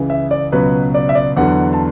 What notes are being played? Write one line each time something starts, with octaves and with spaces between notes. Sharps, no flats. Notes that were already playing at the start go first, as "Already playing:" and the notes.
Already playing: C#2 C#3 E3
E5
D5
C#2 B2 F#3 B4
D5
E5
D5
E2 D3 F#3 F#5
A5